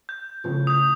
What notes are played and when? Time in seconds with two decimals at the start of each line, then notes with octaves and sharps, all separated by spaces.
0.09 G6
0.44 A2 C#3 F3
0.67 D#6 G6